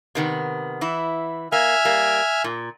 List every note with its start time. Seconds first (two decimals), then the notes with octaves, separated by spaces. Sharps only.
0.15 C3 D#3 B3
0.81 E3 E4
1.52 A#3 E5 G#5 F6
1.85 G3 A#3
2.44 A#2